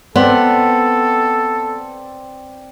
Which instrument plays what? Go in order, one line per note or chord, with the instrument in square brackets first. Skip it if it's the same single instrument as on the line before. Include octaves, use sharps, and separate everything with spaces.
[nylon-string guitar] B3 [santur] C4 D5 [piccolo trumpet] A4